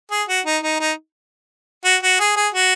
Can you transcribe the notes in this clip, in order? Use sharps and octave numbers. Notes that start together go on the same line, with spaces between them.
G#4
F#4
D#4
D#4
D#4
F#4
F#4
G#4
G#4
F#4